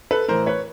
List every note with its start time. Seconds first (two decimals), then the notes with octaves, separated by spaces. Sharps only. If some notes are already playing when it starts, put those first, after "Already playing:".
0.11 A4 B4
0.28 A2 E3 A#4 C5
0.46 B4 C#5